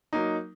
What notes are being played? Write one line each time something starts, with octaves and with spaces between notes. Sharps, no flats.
F#3 A#3 D#4